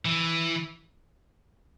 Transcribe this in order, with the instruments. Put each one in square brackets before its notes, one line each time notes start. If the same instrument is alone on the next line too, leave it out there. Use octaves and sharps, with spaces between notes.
[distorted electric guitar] E3